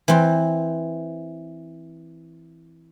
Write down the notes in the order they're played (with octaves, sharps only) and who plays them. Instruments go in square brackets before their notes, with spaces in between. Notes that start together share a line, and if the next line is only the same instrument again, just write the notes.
[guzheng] E3 C4